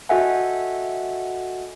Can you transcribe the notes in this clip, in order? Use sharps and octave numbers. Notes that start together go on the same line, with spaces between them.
F#4 A4 D#5 E5 F#5 G#5